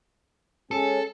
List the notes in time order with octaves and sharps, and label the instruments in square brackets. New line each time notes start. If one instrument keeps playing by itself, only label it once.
[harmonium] G#3 C#4 [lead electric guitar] A4